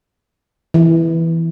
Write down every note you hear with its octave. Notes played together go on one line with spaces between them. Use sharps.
E3